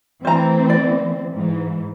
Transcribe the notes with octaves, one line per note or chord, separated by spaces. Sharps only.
E3 A3 C4 C5 A#5
D5
G#2 E3